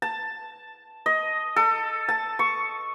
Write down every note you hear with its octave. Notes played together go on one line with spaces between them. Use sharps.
A5
D#5
A4
A5
C#6